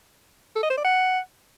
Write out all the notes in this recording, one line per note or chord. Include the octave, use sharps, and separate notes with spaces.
A4
D#5
C5
D5
F#5